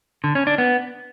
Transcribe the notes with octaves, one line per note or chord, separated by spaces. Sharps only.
D3
C#4
D4
B3